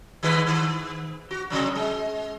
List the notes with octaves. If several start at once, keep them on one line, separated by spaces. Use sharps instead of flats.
D#3 G#3 B4
D#3
F#4
C3 F#3
G#3